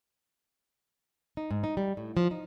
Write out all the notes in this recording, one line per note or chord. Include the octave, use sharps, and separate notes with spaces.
D#4
G#2
D#4
G3
A2
F3
D#4